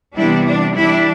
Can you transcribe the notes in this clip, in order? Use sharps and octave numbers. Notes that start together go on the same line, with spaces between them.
C3 E3 G3 B3 D4 E4
D4
E3 G3 D4 E4